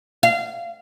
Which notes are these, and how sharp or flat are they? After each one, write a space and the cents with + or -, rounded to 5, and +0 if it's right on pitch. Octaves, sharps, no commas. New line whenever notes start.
F5 -25